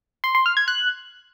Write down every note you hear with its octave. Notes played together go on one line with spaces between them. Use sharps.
C6
C6
F6
G#6
F#6